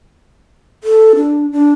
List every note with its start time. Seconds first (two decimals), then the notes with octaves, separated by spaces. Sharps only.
0.84 A4
1.16 D4
1.52 D4